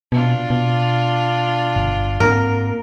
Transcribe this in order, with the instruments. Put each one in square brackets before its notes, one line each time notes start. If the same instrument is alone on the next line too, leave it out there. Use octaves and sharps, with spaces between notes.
[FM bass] B2 [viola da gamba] D4 F4
[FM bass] B2
[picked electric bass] G1
[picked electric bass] G#2 A#3 C4 [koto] A#4